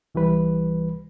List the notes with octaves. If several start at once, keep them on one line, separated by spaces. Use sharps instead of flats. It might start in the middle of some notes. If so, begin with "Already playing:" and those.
C2 E3 G3 B4